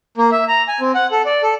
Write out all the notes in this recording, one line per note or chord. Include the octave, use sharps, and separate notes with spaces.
A#3
E5
A#5
G#5
C4
F#5
A4
D5
A4